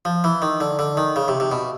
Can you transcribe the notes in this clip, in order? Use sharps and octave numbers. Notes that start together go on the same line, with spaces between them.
F3
E3
D#3
D3
D3
D#3
C#3
C3
C3
B2